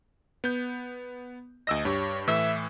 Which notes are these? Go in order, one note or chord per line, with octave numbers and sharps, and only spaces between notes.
B3 G6
D2 D#5 E6 A#6
G2 G4 C#5
A2 E3 E5 E6